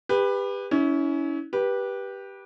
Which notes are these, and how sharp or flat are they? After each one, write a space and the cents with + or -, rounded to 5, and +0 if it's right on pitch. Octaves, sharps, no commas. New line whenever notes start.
G4 +30 B4 +0
C#4 +15 E4 -30
G4 +0 B4 -20